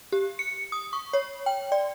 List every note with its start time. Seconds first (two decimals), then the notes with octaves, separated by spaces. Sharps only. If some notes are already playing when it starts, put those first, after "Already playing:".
0.12 G4
0.39 C#7
0.72 D#6
0.93 C#6
1.13 C#5
1.46 G5
1.72 D5